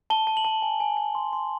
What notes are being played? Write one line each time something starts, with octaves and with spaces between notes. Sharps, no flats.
A5 G7
A5
F#7
A5
G#5
G#5
G#5
C6
C6